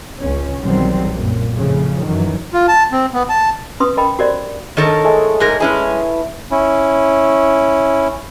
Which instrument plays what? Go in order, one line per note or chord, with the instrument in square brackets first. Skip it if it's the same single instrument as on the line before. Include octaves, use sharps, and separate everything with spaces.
[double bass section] C#2 C#4
B1 E2 D#3 F#3 G3 C4
F#2 A#2
F2 A2 C#3 F3
F#2 D#3 E3 F#3
[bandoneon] F4
A5
C4
B3
A5
[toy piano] C#4 B4 C6 D#6
A#4 D#5 G5 B5
F#4 G4 A#4 C5 D5 D#5
[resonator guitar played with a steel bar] D#3 A4 A#4 [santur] C#5 D#5
[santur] G#3 A3 G#5
[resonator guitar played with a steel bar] G#2 G#4 A#4
[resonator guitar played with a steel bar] G#3 C#4 G#4 [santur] A3 E4 B4
[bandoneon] C#4 E4